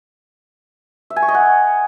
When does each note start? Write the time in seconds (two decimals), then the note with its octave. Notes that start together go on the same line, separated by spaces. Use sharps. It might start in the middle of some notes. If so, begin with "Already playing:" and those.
1.10 E5
1.16 G#5
1.22 C#6
1.28 D#5
1.34 F#5